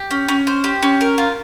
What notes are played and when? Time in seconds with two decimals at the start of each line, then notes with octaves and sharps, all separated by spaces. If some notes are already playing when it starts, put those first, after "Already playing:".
Already playing: G4
0.11 C#4
0.28 C#4
0.47 C5
0.64 G4
0.83 C#4
1.01 A#4
1.18 F4